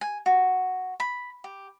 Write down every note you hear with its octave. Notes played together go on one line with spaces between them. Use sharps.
G#5
F#4
B5
G4